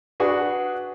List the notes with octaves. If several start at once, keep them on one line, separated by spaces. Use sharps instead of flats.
D4 F#4 G#4 B4